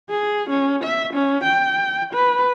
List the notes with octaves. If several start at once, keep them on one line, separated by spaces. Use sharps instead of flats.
G#4
C#4
E5
C#4
G5
B4